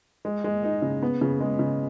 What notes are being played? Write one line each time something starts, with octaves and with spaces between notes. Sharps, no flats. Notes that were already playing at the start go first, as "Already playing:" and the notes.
G#3
G#3
D#4
C#3
B3
C#3
G#3
C#3